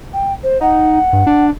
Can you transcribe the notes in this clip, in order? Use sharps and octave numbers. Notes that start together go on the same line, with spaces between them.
G5
C5
D#4 F#5
G2
D4